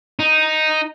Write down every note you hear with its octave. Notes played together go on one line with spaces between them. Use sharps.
D#4